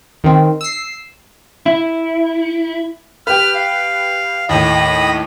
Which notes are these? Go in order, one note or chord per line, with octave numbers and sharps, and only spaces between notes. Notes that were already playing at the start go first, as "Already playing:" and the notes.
D#3 C4
E6 C7
E4
G4 B4 F6
F5
D#2 A2 D#5 B5 D#6